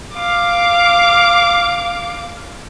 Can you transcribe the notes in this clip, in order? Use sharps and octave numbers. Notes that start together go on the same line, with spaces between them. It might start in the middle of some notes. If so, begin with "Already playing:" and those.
F5 D6